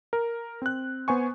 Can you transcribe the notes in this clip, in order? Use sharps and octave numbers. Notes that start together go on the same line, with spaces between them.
A#4
C4 F#6
B3 C5 G#5 C#6